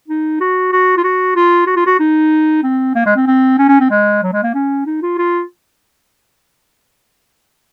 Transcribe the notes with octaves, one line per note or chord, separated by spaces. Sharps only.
D#4
F#4
F#4
F4
F#4
F4
F#4
F4
F#4
D#4
C4
A#3
G#3
C4
C4
C#4
C#4
C4
G#3
F#3
G#3
A#3
C#4
D#4
F4
F4